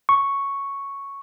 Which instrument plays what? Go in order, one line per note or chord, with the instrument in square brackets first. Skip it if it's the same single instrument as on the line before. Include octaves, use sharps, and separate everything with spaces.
[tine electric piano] C#6